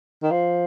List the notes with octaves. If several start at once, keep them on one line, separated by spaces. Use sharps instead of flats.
D#3
F3